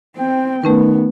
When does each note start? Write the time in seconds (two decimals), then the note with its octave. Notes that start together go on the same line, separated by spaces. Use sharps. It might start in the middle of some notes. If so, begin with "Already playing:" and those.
0.17 C4 G5
0.64 D#3 A3 B3 C#4 B4